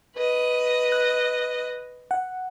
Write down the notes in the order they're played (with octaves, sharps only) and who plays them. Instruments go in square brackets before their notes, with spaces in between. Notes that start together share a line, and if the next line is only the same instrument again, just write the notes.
[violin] B4 D#5
[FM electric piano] F#6
F#5